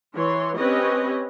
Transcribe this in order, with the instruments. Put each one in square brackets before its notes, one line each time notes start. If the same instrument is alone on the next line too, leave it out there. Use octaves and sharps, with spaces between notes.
[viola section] E3 C#5 C6
C4 C#4 G4 B4 C#5 D#5